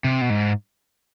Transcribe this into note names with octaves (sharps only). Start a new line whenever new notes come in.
C3
B2
G#2